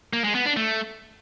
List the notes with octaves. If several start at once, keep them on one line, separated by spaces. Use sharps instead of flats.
A#3
G#3
B3
D4
A3